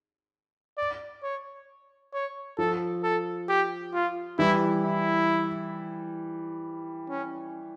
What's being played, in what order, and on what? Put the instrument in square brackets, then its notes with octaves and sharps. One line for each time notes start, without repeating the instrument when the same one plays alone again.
[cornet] D5
C#5
C#5
[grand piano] F3 [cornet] A4
[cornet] A4
G4
F4
[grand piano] E3 G3 [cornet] E4
[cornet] E4
C#4